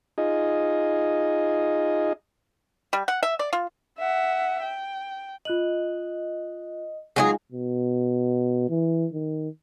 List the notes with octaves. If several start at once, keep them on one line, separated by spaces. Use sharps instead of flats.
D#4 F4 G#4 D#5
G3
F#5
E5
D5
F4
E5 F#5
G5
F4 D#5 F#6 F#7
F#3 G#3 D#4 F4 F#4 G#4 G#5
B2
E3
D#3